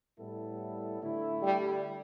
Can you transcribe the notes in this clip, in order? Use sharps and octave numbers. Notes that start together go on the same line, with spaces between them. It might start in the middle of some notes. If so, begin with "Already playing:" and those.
A2 G3 B3 E4 A4
D3 A3 E4
G3